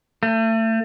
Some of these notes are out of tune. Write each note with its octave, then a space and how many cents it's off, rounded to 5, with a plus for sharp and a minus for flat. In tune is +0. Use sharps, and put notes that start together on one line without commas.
A3 +30